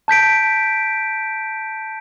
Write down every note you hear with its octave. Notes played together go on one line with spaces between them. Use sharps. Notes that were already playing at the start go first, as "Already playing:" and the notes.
A5 G6 B6 D7